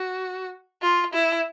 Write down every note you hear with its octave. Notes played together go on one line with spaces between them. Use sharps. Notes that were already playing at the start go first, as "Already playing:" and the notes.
Already playing: F#4
F4
E4